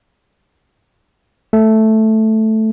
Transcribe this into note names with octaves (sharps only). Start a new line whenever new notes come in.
A3